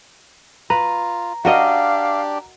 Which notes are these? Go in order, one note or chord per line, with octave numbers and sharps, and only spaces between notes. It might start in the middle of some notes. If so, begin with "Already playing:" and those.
F4 B4 A#5
D4 F#4 G4 A#4 D#5 F5